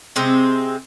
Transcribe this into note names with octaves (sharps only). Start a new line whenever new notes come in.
C3 G#3 C4